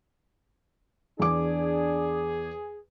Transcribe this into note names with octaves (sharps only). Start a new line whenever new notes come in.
E2 D4 G#4 D6